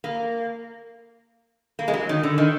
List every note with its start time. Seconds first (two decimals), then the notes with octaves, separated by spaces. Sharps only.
0.04 A#3
1.79 A#3
1.88 G#3
1.94 F#3
2.09 D#3
2.23 D3
2.38 D#3